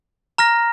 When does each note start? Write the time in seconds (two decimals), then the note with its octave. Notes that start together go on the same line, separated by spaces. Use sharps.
0.38 A#5 F6 A#6